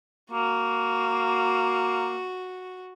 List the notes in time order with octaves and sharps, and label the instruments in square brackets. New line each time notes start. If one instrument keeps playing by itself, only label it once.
[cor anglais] A#3 [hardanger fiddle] F#4